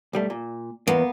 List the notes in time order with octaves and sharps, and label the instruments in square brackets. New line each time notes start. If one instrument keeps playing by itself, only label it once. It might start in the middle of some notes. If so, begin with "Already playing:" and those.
[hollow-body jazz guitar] B1 G3 A3
A#2
[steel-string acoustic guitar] E2 [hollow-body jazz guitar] A#3 B3